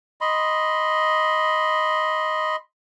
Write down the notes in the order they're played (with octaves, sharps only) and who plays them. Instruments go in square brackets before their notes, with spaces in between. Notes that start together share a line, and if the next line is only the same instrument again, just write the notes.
[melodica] D#5 B5 C6